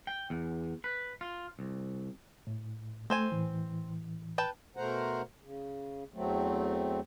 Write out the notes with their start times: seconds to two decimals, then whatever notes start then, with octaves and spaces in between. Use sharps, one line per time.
0.07 G5
0.30 E2
0.84 B4
1.21 F4
1.59 C2
2.47 A2
3.10 A3 C4 C5 G#5
3.32 A2 E3
4.38 B4 G5 A5
4.77 B2 A3 A#4 C5 F#5 A#5
5.43 C#3
6.14 E2 F#3 A3 C4